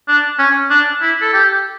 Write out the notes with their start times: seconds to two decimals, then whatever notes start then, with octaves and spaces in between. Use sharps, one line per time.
0.08 D4
0.39 C#4
0.70 D4
1.02 E4
1.21 A4
1.33 G4